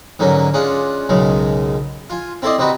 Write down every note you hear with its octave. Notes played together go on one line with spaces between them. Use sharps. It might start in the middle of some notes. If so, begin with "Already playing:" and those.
G#2 D3 F#3 A#3 C#4
G#3 C#4 D4 F4 F#5
B1 F#2 C#3 G#3
F4 G#5
C4 E4 A4 C5 D5 D#5
C3 C4 D#4 F#4 B4